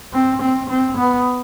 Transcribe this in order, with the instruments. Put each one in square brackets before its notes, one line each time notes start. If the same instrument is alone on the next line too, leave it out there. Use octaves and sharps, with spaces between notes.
[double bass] C4
C4
C4
B3